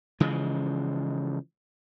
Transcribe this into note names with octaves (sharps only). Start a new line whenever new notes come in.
C#3 E3 F3 G#3